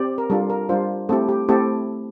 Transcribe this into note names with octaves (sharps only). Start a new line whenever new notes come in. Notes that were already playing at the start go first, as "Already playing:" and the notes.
Already playing: C4 G4 D5
A#4
G3 D4 F4 A4
A#4
G3 D4 F4 C5
A3 C4 E4 G4 A4
G4
A3 C4 E4 G4 A4